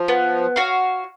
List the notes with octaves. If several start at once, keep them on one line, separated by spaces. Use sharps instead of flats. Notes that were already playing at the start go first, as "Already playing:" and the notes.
Already playing: F3
B3
F#4 C#5 F5